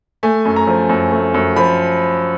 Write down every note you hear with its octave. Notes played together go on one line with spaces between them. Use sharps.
A3 G#5
F#2
A#5
F3
F#2
A3
F#2
F3 B5